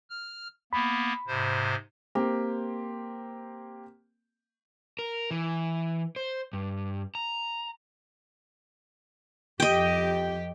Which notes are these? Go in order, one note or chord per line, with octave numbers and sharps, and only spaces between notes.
F6
A#3 B3 B5
G#2 C3 C5
A#3 C4 G4
A#4
E3
C5
G2
A#5
F2 G4 D#5 G5